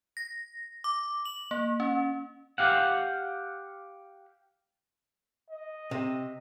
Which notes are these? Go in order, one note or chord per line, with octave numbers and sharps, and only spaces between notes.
A#6
D6
F#7
A#3
C#4
G4 F5 F#5
D#5
C3